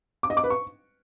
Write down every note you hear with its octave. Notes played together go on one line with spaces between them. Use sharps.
D6
D#5
D6
B4
C#6